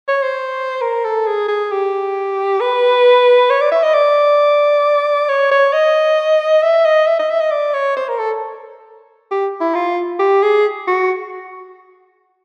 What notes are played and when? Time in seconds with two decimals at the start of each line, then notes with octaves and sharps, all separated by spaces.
0.08 C#5
0.23 C5
0.82 A#4
1.05 A4
1.27 G#4
1.48 G#4
1.72 G4
2.60 B4
3.50 C#5
3.61 D5
3.72 E5
3.83 D#5
3.94 D5
5.29 C#5
5.51 C#5
5.73 D#5
6.63 E5
6.85 D#5
7.07 E5
7.19 D#5
7.30 E5
7.41 D#5
7.51 D5
7.74 C#5
7.97 C5
8.08 A#4
8.19 A4
9.31 G4
9.61 E4
9.75 F4
10.19 G4
10.43 G#4
10.87 F#4